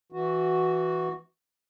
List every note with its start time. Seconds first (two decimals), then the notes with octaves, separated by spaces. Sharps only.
0.12 E3 F#4